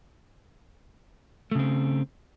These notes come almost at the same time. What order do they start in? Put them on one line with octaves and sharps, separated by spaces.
A3 C#3 C4